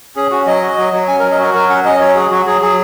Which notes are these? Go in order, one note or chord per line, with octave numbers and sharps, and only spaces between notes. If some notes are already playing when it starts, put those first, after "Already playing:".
C#4 G#4
C#4 F#4
F#3 D#5
F#4
F#3
F#3
C#4 G#5
A#4
F#3
D#5
F#4 A#4
F#3 A#4
C#4 F#5
C#4 D#5
F#3 C#5
F#4 G#4
F#3 F#4
F#3 G#4
F#3 G#4